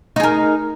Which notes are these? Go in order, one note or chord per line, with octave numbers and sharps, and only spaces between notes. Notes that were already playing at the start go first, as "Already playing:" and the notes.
D#4 G#4 A#4